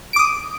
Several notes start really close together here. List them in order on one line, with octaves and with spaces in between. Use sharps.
D7 D6 D#6